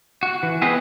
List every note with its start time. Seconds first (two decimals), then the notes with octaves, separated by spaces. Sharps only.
0.23 F#4
0.43 E3
0.62 B3 C4 G#4 B4 C5 D#5